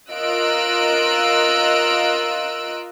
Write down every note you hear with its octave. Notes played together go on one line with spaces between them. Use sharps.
F4 A#4 D#5 E6 F#6 D7